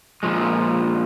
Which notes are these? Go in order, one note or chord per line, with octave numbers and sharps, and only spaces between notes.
A#2 F3 G#3